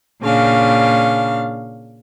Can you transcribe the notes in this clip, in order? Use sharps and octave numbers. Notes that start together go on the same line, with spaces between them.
A#2 C#3 D4 F5